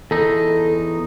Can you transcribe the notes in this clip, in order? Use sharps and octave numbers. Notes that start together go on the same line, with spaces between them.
E2 D#4 A4